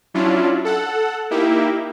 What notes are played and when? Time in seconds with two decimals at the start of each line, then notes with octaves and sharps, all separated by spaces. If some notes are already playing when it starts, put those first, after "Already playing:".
0.14 F#3 C#4 D4 E4 F4
0.65 A4 F#5
1.30 A#3 D#4 E4 G4